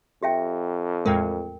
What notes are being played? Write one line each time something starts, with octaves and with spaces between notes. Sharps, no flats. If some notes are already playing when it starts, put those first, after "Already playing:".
F2 G4 E5 G5
E2 A2 G#3 A#4 G5